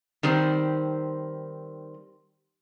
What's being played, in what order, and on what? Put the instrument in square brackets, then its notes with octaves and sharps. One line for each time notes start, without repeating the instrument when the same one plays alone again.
[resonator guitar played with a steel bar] D#3 G3 C4 C5